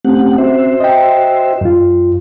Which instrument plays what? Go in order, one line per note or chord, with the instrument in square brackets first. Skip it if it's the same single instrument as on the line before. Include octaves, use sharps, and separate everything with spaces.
[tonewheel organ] A3 G4 F#5 [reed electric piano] C4 C#4
[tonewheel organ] F#4 C5 E5
[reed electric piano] D#5 G5
F#2 F4